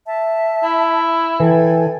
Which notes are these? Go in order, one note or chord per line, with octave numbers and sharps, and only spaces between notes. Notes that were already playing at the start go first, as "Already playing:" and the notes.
E5 A5
E4
E3 A4 G5 G#5